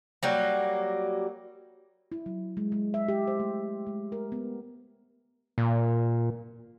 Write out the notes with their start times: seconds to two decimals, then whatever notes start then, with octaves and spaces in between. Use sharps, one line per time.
0.23 F#3 G3 A#3
2.12 E4
2.26 F#3
2.57 G#3
2.72 G#3
2.94 E5
3.08 G4
3.27 C5
3.40 A3
3.87 G#3
4.12 A#4
4.32 B3
5.58 A#2